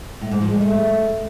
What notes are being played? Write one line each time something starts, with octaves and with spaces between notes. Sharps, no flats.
A2
G#2
F3
G#3
A3